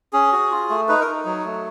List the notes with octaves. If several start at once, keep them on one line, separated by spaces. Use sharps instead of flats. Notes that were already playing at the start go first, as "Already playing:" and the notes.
C#4 G#4
F#4
F4
A3
D#4 B4
A#4
D#4
F#3
A3